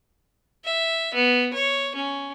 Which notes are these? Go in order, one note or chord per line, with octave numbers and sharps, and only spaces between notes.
E5
B3
C#5
C#4